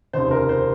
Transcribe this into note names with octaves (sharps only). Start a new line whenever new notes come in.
F1 D#2 C#3 C5
A#4
C5